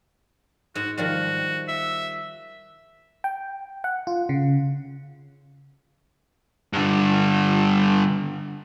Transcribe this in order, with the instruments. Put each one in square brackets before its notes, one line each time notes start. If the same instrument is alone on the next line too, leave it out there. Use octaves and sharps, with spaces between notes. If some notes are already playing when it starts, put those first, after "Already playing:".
[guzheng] G#2 [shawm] F#4
[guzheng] D#3 F3 G3 [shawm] F#4
[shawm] E5
[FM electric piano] G5
F#5
F4
C#3
[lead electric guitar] G2 D3